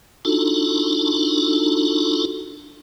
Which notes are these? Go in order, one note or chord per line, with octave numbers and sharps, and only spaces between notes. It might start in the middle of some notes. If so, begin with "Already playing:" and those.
D4 D#4 F4 F#4 A4